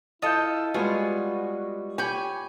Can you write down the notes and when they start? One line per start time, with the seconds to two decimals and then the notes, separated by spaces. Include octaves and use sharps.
0.22 E4 F4 A4 D#5 G6
0.74 G3 G#3 B3 F4 F#4 G#4 C#5 G#5
1.98 G4 C#5 G#5 B5 G6